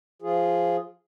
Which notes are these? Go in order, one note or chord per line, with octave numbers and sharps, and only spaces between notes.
F3 F4 G#4